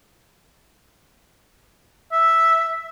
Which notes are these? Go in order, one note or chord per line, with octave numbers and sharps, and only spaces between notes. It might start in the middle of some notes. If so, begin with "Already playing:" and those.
E5